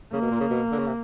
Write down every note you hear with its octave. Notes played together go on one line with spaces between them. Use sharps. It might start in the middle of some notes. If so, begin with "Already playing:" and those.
C#3 A#3
B2
A#2
C#3
B2
D3
C#3
C3